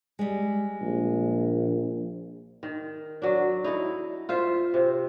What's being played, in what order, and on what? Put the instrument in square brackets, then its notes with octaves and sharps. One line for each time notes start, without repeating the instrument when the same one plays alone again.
[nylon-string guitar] G3 G#3
[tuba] A#1
[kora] D#3
F#3 D4
D#4 E4 A4
F4 C5 E5
C3